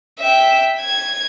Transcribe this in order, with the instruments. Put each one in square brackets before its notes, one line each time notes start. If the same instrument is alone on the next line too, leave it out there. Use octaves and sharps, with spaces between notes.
[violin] E5 G5
G#6